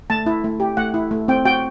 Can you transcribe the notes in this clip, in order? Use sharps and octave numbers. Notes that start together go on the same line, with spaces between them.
A3 A5
E4
A3
G4
A3 F#5
E4
A3
C4 G5
F#4 G5